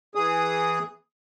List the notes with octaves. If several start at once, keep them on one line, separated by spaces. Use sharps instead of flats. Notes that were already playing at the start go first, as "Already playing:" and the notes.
E3 G#4 D#6